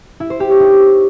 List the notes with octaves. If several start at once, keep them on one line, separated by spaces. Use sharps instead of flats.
E4
C5
G4
C#5
D#4